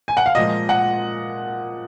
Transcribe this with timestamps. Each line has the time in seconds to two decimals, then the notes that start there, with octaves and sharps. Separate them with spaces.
0.08 G#5
0.17 F#5
0.26 F5
0.35 A#2 F3 G#3 D#5
0.69 F#5